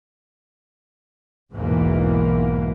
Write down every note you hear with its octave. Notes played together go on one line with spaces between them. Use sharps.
B1 E2 G#2 B2 E3 A#3